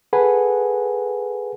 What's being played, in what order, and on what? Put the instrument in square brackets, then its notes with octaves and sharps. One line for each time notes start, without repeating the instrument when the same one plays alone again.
[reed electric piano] G#4 A4 B4 F#5 G#5